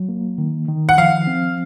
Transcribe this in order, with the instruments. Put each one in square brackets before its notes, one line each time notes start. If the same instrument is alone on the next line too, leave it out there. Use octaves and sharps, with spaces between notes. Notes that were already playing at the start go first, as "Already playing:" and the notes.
Already playing: [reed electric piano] F#3
A#3
D#3
D#3
[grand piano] F#5
[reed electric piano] F3 [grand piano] F5
[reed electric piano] C4